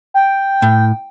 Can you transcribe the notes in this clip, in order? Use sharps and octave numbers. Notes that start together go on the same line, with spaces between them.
G5
A2